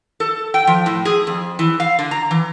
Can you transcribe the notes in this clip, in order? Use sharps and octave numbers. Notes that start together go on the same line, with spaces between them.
A4
G5
F3
A2
G#4
F2
E3
F5
D3
A#5
E3